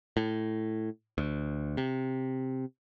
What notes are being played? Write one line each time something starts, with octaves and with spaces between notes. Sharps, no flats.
A2
D2
C3